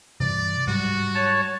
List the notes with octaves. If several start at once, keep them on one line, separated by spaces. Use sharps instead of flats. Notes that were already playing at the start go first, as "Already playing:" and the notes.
G2 C3 E3 D5
G#2 F#3 G3 F#4
C#5 A5